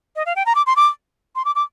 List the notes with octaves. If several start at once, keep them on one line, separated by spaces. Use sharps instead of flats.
D#5
F5
G5
A#5
D6
C6
D6
C6
D6
D6